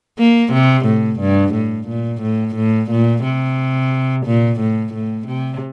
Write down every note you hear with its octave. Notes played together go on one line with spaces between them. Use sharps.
A#3
C3
A2
G2
A2
A#2
A2
A2
A#2
C3
A#2
A2
A2
C3